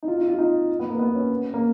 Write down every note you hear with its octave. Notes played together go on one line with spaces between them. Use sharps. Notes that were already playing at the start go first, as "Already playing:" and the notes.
D#4
F4
D#4
F4
D#4
B3
A#3
B3
C#4
A#3